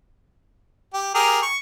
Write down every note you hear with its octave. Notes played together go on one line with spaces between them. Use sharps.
G4
G4 G#4 A#4
C#6